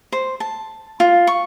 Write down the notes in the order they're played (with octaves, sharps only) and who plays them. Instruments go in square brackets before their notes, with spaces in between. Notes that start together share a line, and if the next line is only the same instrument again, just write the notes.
[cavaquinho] C5
A5
F4
C#6